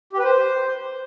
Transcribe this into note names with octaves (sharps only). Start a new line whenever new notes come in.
G4
B4
C5